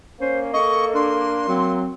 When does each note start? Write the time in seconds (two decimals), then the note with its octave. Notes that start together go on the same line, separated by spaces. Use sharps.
0.21 A#3 C#4 C5
0.53 A4 D#5 C#6
0.94 D4 C6
1.48 F#3 C4